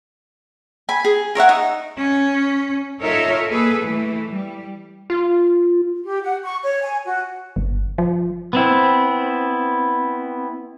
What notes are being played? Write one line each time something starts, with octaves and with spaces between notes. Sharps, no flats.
G#5 B5
G#4
A#4 C#5 E5 F#5
D#4
C#4
D#4 F4 A4 A#4 C#5 E5
A#3 G#4 A4 B4
E3 A3
G3
F4
G4
F#5
C#6
C#5
G#5
F#4
G1
F3
B3 C4 E4